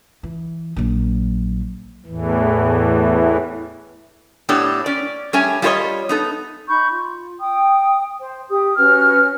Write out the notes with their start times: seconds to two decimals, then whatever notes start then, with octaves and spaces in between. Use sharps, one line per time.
0.23 E3
0.76 A#1 F#3
2.06 E2 A2 E3
4.49 A2 B3 D4 G4 A4 C#5
4.86 C#4 D5
5.33 G3 A3 C#4 C#5 G#5
5.62 G3 F4 F#4 C5 C#5 D#5
6.09 B3 D#4 A4
6.68 D#4 B5 C#6 G6
6.89 F4
7.40 G5 D#6
8.20 C5
8.49 G4 D#6
8.77 C#4 F#4 B4 F6